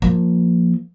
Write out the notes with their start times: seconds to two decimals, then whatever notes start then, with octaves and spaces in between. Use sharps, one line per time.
0.02 F3 A#3